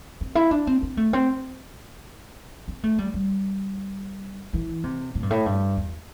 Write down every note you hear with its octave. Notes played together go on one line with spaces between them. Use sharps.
C4
E4
D4
C4
C4
A3
C4
C4
A3
G3
G3
E3
C3
A2
G2
A2
G2
E2